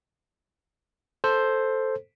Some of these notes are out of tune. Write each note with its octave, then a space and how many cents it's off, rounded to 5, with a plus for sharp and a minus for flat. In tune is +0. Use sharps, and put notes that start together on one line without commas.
A4 +0 C5 +5